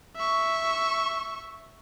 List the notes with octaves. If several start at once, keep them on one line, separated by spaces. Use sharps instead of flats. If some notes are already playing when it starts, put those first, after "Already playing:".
E5 C#6